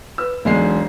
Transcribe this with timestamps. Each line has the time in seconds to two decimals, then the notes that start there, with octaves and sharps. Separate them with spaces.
0.18 B4 E6
0.45 E1 B1 G#3 C7